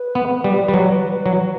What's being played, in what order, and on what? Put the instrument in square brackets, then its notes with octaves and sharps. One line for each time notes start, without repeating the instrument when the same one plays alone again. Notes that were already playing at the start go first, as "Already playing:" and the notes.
Already playing: [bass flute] B4
[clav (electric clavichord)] B3
G3
G3
F#3
F#3